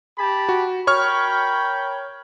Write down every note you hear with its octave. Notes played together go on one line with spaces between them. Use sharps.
G4 A5 B5
F#4
A#4 C#5 G5 B5 C#6 F6